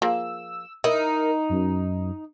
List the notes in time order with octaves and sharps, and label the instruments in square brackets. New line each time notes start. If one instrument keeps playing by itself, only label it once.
[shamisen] F3 A#3 G#4 [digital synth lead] E6
[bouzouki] D#4 [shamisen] E4 [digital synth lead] A#4
[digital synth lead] F#2